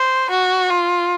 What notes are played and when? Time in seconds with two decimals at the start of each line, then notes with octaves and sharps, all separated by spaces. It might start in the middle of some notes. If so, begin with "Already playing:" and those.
Already playing: C5
0.30 F#4
0.70 F4